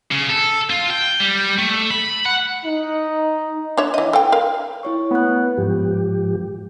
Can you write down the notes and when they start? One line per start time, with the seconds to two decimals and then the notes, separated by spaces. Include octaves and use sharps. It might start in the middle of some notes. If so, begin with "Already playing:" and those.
0.11 C#3
0.29 A4
0.70 F4
0.90 G5
1.20 G3
1.59 A3
1.90 B5
2.25 F#5
2.66 D#4
3.77 D4 C#5 E5
3.94 E3 D#5
4.13 A4 F5 G5
4.32 A#4 F5
4.83 E4 C#5 C#6
5.11 A3 B3 F#6
5.58 G#2 F3 G4